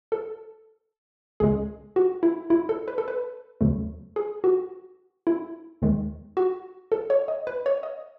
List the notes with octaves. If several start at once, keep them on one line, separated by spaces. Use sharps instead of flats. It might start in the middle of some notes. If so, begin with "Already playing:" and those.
A4
C#2 C#3 G#3 G#4
F#4
E4
E4
A4
B4
A4
B4
D#2 C#3 F#3 A3
G#4
F#4
E4
D#2 D#3 G#3
F#4
A4
C#5
D#5
B4
C#5
D#5